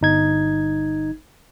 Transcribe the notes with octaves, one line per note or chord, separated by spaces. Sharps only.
G1 D#4 G#6